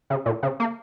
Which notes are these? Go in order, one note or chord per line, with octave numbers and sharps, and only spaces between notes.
C#3
A#2
C#3
A#3